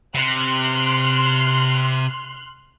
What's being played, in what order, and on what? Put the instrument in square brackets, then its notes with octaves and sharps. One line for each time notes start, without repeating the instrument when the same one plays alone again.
[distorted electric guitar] C3 [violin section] C6 F6 F#6